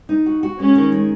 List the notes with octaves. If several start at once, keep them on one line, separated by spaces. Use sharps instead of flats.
D#4
F#4
F#4
G#3 C#4
D#3
G#3